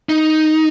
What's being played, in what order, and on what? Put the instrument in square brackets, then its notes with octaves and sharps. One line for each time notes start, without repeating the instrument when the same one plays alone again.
[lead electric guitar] D#4